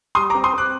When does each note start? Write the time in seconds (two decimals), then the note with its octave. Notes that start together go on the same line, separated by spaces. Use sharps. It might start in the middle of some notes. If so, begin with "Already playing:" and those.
0.15 G3 C6 D#6
0.30 A#5 D6
0.34 C4
0.44 C6 D#6
0.53 C4 D6 F#6